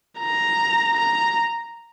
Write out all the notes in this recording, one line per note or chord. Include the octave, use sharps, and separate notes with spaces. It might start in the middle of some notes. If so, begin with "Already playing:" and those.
A#5
A#5